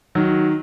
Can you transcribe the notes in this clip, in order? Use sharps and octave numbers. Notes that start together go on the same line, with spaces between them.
D#3 F#3